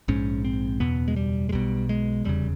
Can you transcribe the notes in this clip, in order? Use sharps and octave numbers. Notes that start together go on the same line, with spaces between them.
A#1 G#2 C#4
C4
F#1 E2 B2 B3
G#3
G3
G#3
B1 B2 G3
G#3
F1 E2 C#3 G3